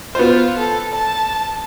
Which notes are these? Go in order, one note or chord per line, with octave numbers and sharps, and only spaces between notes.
B3 F4 C5
A4
A5